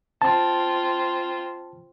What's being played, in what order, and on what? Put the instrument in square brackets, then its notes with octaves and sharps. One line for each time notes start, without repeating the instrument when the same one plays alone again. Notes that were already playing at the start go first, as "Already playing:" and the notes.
[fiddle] C4 F4 [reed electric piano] A5